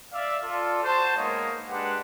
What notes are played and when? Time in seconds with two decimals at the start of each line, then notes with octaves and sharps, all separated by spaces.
0.13 D5 E5 F5
0.43 F4 A4 D5
0.84 F#4 C5 A5
1.17 G#3 A#3 B3 D#4 C#5 F5
1.69 G#3 D4 G4 B4 F#5